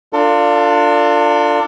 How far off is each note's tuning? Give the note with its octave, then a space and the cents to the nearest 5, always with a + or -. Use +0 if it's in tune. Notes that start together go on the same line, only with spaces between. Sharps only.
D4 +0 F4 +0 A4 +40